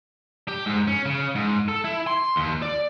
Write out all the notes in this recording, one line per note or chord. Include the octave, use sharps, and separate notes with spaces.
G4
G#2
C#4
C#3
G#2
A4
E4
C6
D#2
D5